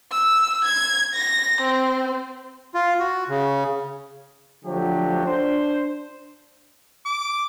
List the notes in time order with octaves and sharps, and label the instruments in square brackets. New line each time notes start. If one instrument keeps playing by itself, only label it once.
[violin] E6
G#6
A#6
C4
[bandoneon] F4
F#4
C#3
[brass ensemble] D3 F3 F#3 A3 G4
D4 C5
[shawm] D6